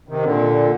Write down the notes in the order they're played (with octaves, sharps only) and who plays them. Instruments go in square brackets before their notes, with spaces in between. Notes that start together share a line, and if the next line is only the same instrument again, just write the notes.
[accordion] C3 D#3
A#2 D3